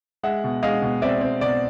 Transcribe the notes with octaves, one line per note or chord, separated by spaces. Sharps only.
G#3 E5 F#5
B2
G#3 D#5 F5
B2
C4 D5 E5
C4
B2 D5